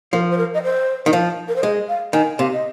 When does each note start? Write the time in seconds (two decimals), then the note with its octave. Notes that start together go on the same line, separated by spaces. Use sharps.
0.13 F3 A#4
0.30 C5
0.38 A#4
0.54 D#5
0.63 C5
1.06 D#3
1.13 F3
1.48 A#4
1.56 C5
1.63 G#3 D#5
1.88 F5
2.13 D#3 G#5
2.38 C3 F5
2.53 D#5